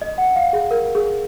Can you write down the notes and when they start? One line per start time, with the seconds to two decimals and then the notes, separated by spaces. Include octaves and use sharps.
0.02 D#5
0.18 F#5
0.36 F5
0.53 G#4
0.71 A#4
0.95 G#4